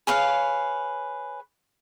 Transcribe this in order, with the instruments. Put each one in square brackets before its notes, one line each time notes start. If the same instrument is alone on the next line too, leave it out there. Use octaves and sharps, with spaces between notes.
[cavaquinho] G#4 B4 C#5 F5